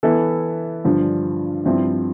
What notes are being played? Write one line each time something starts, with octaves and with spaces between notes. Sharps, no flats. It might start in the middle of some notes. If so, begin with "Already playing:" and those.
E3 B3 E4 A4
G2 D3 F3
G2 F3 C4 E4